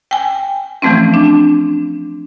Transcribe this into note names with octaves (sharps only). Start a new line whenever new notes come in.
G5 G#5
E3 F3 A3 C4 C#4
D4